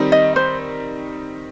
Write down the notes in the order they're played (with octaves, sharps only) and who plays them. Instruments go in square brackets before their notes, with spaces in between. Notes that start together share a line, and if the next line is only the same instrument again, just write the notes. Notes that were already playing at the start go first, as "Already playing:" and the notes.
Already playing: [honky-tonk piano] D#3 G3 C4 D#4
[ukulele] D#5
C5